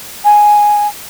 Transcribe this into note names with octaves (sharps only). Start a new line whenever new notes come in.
G#5